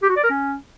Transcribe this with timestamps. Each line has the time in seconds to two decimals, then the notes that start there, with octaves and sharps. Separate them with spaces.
0.03 G4
0.10 F#4
0.16 D5
0.23 A#4
0.30 C#4